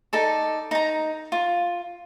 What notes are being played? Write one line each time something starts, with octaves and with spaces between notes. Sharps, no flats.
D#4 A4 D5
D#4 A#5
F4